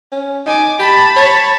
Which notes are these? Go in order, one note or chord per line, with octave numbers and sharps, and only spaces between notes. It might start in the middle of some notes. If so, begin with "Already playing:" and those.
C#4
D#4 G#5 D6
G4 A5 B5
C#5